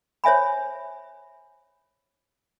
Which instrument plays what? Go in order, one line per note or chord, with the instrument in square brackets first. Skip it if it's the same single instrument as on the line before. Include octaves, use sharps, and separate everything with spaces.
[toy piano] C5 C#5 E5 G#5 B5